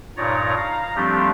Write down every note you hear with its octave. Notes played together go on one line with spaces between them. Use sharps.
G2 A#2 D#4 C#5 D5 A#5
F5 A#5
F3 G3 A3 C4 D4 G4